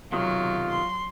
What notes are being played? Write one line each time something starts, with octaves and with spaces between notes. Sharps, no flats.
B1 C3 D#3 F#3 F4
C6